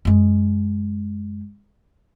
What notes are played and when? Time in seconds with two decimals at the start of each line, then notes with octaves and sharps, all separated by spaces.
0.05 F#2 G#3